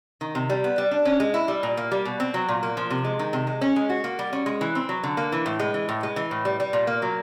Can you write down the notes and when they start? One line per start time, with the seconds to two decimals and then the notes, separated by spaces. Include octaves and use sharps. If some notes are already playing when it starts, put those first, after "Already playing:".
0.21 D#3
0.35 C3
0.50 G3
0.64 B3
0.78 G3
0.91 D4
1.05 C#4
1.20 G#3
1.34 E4
1.48 G3
1.63 A#2
1.77 A#3
1.92 G3
2.05 B2
2.20 C4
2.34 F#3
2.48 A#2
2.63 A#3
2.77 F3
2.90 C3
3.05 G#3
3.19 D#3
3.33 C3
3.47 G#3
3.61 C#4
3.76 G#3
3.90 F#4
4.04 A#3
4.19 G3
4.33 C#4
4.46 G#3
4.61 E3
4.75 C4
4.89 F#3
5.03 D3
5.17 A#3
5.32 E3
5.46 A2
5.60 G#3
5.74 E3
5.89 A2
6.03 G#3
6.16 E3
6.31 A2
6.45 G3
6.60 G3
6.73 A#2
6.87 A#3
7.02 F#3